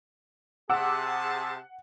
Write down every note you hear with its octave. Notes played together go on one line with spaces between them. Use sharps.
C3 G#4 F#5 A5 D6 E6